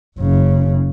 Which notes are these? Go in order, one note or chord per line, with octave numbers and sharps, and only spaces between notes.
F#1 C#3